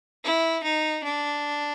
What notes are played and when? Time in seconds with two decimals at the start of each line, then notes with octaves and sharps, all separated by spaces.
0.24 E4
0.64 D#4
1.04 D4